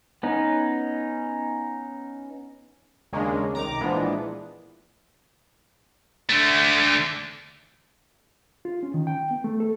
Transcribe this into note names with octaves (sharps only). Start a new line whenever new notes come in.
B3 C#4 D#4
D#2 C#3 G#3 A#3 C#4 D4
C2 D#3 A#5 D6
A#2 E3 F3 G#3 B3 D4
D3 A3
F4
C#4
D#3
G5
B3
A3
A4